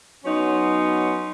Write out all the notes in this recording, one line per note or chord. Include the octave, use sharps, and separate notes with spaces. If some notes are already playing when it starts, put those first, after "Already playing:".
F#3 B3 C#4 D#4 C6